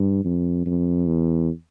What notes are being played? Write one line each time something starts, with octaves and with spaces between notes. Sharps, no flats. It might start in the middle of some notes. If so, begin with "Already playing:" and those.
Already playing: G2
F2
F2
E2